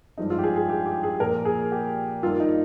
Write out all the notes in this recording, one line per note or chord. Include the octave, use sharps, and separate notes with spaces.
G2 F3 G#3 D#4
F4
G4
G#4
G#4
G4
G4
G#4
A#2 F3 A#3 A#4
G#4
G4
G2 D#3 A#3 F4
D#4